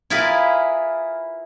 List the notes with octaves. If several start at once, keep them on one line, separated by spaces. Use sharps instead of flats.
E4 F4 G#4 A#4 B4